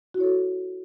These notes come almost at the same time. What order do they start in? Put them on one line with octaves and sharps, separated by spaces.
F#4 E4 C#5 A4